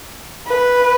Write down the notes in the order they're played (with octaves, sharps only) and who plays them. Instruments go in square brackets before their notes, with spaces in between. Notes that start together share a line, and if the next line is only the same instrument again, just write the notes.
[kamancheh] B4